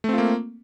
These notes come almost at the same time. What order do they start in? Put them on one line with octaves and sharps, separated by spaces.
A3 C4 F4 A#3